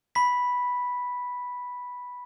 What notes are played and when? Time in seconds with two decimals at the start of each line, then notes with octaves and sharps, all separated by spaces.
0.15 B5 B6